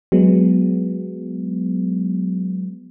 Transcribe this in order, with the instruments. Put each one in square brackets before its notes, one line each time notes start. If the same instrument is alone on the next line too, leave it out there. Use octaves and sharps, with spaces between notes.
[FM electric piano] F#3 G#3 B3